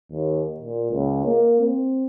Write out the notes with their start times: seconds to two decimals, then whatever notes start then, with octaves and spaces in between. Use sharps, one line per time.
0.11 D#2
0.60 A#2
0.92 C#2
1.26 A#3
1.61 C4